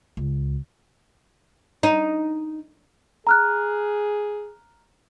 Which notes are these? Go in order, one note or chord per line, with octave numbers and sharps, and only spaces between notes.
C#2
D#4
G#4 A#5 F6 F#6